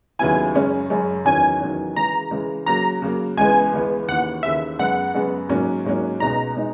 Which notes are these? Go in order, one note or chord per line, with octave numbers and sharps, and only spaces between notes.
D#2 C#3 F#3 B3 E4 G#5
F#2 C#3 G#3 C#4
F#2 C#3 G#3 C#4
E2 D#3 F#3 C#4 G#5
E2 D#3 F#3 C#4
C#3 E3 G#3 A#5
C#3 E3 G#3
C#3 F#3 A#3 A#5
C#3 F#3 A#3
C#2 C#3 E3 G#3 B3 G#5
C#2 C#3 E3 G#3 B3
D#2 C#3 E3 A#3 F#5
D#2 C#3 E3 A#3 E5
F#2 C#3 G#3 B3 F#5
F#2 C#3 G#3 B3
G#2 F#3 A#3 C#4
G#2 F#3 A#3 C#4
C#2 B2 G#3 D#4 A#5
B2 G#3 D#4